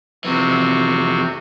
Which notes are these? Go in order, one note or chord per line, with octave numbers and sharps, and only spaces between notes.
F2 C3 E3 C4 F#4